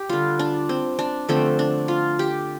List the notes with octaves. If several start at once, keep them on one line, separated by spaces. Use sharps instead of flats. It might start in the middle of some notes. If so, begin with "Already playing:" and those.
Already playing: G4
D3 G3 F4
D4
C4
D4
D3 F3 A3 C4
D4
F4
G4